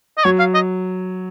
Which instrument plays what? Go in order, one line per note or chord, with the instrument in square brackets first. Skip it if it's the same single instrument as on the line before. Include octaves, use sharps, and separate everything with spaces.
[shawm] D#5
[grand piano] F#3 [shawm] C#5
[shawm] F5
D#5